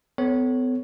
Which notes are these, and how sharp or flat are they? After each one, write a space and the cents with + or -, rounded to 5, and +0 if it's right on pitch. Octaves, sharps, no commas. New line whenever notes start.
B3 +40 A4 +0 C#5 +0